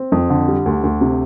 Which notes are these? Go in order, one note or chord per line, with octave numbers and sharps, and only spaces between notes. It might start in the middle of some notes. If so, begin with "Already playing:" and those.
Already playing: C4
F2
D3
G3
D2
D2
C3